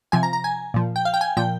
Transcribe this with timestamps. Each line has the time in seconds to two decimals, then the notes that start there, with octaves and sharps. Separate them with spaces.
0.12 C3 F3 G#5
0.23 A#5
0.33 A#5
0.44 G#5
0.74 A#2 F3
0.96 G5
1.05 F5
1.14 G5
1.21 G#5
1.37 A#2 F3 G5